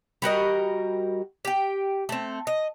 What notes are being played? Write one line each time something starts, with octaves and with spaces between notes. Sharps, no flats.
G3 F#4 A#4 D#5
G4 G5
A3 C4
D#5